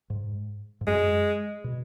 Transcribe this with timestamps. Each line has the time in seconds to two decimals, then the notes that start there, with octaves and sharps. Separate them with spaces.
0.10 G#2
0.81 G#2
0.87 F#2 G#3
1.64 B2